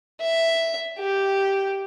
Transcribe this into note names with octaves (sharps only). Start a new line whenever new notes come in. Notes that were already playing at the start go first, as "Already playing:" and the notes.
E5
G4